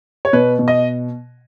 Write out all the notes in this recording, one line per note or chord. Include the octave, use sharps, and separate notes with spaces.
C#5
B2 B4
B2
D#5